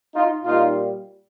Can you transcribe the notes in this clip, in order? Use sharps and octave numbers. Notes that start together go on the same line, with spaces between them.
D#4 F4
A#2 G3 D#4 F4